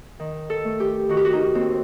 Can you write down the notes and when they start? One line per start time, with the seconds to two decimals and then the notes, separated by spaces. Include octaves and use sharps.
0.20 D#3
0.50 A4
0.64 A3
0.80 G4
1.09 D#3 F#4
1.17 G4
1.25 F#4
1.33 D#4
1.55 D#2 C4